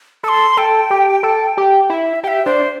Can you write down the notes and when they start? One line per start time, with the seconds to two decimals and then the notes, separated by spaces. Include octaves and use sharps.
0.23 A4 E6
0.29 C6
0.57 A4 G5
0.90 G4
1.23 A4
1.57 G4
1.89 E4 E5
2.23 G4 G5
2.28 E5
2.45 D4 C5